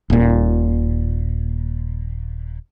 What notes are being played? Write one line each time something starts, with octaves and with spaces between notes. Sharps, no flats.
D#1 A#2